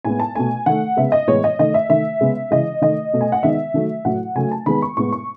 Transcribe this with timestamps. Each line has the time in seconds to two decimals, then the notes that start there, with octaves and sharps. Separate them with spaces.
0.05 A2 G#3 B3 G#5
0.20 A5
0.35 B2 A3 G#5
0.66 D#3 A3 F#5
0.97 C#3 G#3 B3 E5
1.12 D#5
1.27 A2 E3 G#3 B3 C#5
1.44 D#5
1.59 D#3 A3 D#5
1.74 E5
1.89 D#3 A3 E5
2.21 C#3 G#3 B3
2.51 C#3 E3 G#3 D#5
2.82 D#3 A3 D#5
3.13 B2 A3
3.21 G#5
3.32 F#5
3.43 D#3 G#3 B3 E5
3.74 D#3 F#3 A3
4.05 A2 F#3 A3 F#5
4.35 C#3 F#3 A3 G#5
4.51 A5
4.66 D#3 G#3 B3 B5
4.82 C#6
4.97 A2 G#3 B3 C#6
5.12 C#6